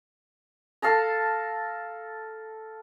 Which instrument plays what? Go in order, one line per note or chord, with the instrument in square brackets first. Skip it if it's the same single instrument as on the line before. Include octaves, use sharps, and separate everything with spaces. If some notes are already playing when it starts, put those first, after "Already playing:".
[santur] A4 F5 A5 A#5